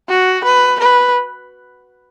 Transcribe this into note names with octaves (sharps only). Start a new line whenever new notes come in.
F#4
B4
B4